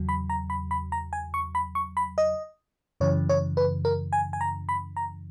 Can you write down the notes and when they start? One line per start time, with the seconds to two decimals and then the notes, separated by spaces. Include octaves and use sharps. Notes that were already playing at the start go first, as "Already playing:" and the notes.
Already playing: E2 C#3 F#3
0.09 B5
0.30 A#5
0.50 B5
0.71 B5
0.92 A#5
1.13 G#5
1.34 C#6
1.55 B5
1.75 C#6
1.97 B5
2.18 D#5
3.00 F#2 C#3 E3 C#5
3.29 C#5
3.57 B4
3.85 A#4
4.13 G#5
4.33 G#5
4.41 A#5
4.69 B5
4.97 A#5